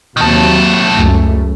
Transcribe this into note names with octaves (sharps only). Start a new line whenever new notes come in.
D#2 C3 D#3 F#3 A4
C#2 F#2 A3